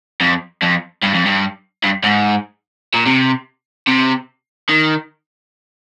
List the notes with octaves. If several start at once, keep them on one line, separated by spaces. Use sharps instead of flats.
F2
F2
G2
F2
G2
G2
G#2
A#2
C3
C3
D#3